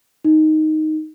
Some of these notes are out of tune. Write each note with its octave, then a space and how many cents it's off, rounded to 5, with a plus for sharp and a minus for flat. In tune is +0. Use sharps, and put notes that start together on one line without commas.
D#4 +0